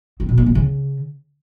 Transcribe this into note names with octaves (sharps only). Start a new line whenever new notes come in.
C4
B2
A#3
B2
C#3